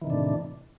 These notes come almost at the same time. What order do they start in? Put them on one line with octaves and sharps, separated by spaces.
E3 D#3 C3 D4 A2